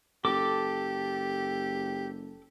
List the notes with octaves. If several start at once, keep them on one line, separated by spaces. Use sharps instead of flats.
F#1 G4 A4 D6